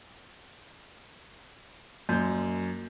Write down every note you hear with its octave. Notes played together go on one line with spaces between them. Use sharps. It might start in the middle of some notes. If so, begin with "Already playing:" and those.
F#2 A#3 G6